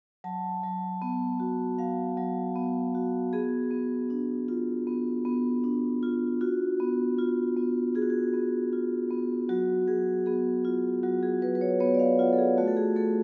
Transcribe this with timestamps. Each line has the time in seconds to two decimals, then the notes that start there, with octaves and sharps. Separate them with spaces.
0.24 F#3 A5
0.63 F#3
1.02 B3
1.40 F#4
1.79 F#3 F5
2.17 F#3
2.56 B3
2.95 F#4
3.33 B3 G#4
3.71 B3
4.10 D4
4.48 F4
4.87 B3
5.25 B3
5.64 D4
6.03 F4
6.41 F4 F#4
6.80 B3
7.19 F4
7.56 B3
7.95 F4 G#4
8.02 F#4
8.10 G#4
8.33 B3
8.73 F4
9.11 B3
9.49 F#3 F#4
9.87 F#3 G#4
10.26 B3 G#4
10.65 F4
11.03 F#3 F#4
11.23 G#4
11.42 F#3 B4
11.55 B4
11.61 C#5
11.80 B3 C#5
11.94 D5
11.99 F5
12.19 F4 F#5
12.33 A4
12.38 G#4
12.58 A3 F#4
12.68 A4
12.77 G#4
12.96 A3 A4